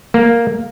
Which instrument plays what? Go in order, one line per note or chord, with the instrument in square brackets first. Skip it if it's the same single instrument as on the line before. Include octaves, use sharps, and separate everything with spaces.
[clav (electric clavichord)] A#3